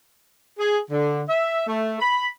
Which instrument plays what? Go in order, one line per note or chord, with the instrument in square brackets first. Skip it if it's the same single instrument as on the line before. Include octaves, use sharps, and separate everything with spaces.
[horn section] G#4
D3
E5
A3
B5